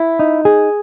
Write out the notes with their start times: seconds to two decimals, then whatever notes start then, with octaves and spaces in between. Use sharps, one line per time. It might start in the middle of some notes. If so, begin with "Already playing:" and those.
Already playing: E4
0.19 D#4
0.45 G#4